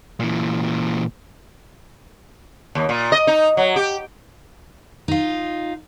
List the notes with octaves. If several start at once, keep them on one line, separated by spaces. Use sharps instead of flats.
A#2 E3
D#2
A#2
D#5
D#4
F#3
G4
D#4 F4